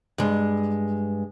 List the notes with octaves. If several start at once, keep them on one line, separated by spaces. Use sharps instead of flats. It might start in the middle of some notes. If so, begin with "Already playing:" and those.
G2 G#3